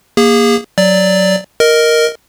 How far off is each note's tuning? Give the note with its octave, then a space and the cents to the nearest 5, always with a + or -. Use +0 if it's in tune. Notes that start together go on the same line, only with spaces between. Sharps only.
A#3 +10 G#4 -25
F#3 +0 D5 +0
A#4 +0 D#5 +0